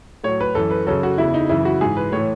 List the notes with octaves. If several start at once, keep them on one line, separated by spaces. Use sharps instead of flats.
A2 F#3 C#5
B4
F#2 E3 A4
B4
F#2 C#3 F#3 A4
F#4
E2 C#3 E3 E4
D#4
F#2 C#3 E3 E4
F#4
G#2 E3 G#4
B4
A2 E3 C#5